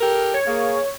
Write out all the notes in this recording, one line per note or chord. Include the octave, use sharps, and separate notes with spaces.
G4 A4 A#4
C#5
A#3 G#4